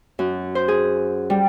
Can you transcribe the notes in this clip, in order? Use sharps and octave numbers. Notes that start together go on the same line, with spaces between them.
F#2
C5
G#4
G3